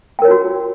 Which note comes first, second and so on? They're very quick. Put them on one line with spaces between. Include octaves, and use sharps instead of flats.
G5 A#4 C#5 F4 F#4